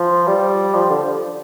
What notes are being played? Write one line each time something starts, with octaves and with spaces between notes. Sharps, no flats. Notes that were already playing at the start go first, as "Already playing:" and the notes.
Already playing: F3
G3
F3
D3